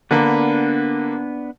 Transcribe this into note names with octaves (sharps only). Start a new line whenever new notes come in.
D3 A#3 B3 D4 B4